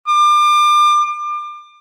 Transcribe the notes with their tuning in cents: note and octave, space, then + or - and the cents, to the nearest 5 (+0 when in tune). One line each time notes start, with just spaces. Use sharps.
D6 +35